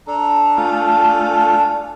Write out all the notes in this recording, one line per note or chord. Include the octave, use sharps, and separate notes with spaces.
D4 A4 A#5
A3 F4 G#5